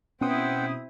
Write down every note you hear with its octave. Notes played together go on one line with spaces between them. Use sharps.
B2 C4 C#4 E4 C5 F#5 G5 D#6